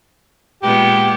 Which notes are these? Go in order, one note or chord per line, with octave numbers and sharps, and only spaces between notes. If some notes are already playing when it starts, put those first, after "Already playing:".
A#2 G#3 B3 G4